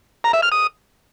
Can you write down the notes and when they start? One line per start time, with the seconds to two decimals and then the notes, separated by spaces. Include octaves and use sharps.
0.24 A#5
0.33 E5
0.43 F6
0.52 D#6